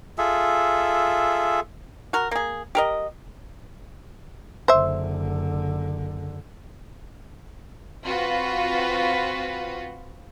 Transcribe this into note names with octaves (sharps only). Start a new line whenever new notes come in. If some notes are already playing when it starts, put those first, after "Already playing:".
F4 G#4 A4 E5
F#4 A#4
A#3 G#4
G4 A#4 D#5
F#1 D3 C5 E5
C4 F4 F#4 B4